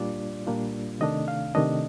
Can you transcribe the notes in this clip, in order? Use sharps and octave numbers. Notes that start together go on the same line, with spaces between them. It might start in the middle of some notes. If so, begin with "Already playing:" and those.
Already playing: A#2 G3 A#3 D4 F4 D5
A#2 G3 A#3 D4 F4
C3 D#3 A3 D4 D#5
F5
C3 D#3 A3 D4 D#5